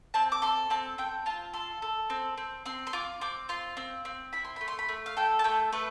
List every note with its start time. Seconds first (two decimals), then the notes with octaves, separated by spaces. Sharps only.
0.14 C4 A5
0.32 D6
0.42 A4 C6
0.70 C4 A5
0.98 C4 G5
1.26 F4 A5
1.53 A4 C6
1.82 A4
2.10 C4
2.38 C4
2.66 C4 C6
2.87 C6
2.93 F4 D6
3.21 C4 D6
3.49 F4 C6
3.77 C4
4.05 C4
4.33 E4 B5
4.44 C6
4.56 A3 B5
4.68 C6
4.79 B5
4.89 A3
5.06 F5
5.17 A4 G5
5.39 A5
5.44 A3 G5
5.73 A3 B4